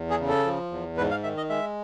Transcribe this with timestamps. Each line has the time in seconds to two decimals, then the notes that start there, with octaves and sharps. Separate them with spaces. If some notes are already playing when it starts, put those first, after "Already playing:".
Already playing: E2
0.10 G#4
0.20 C#3
0.28 A4
0.45 F3
0.71 E2
0.97 G#2 B4
1.11 F5
1.23 D#3 E5
1.37 D#5
1.50 G#3 E5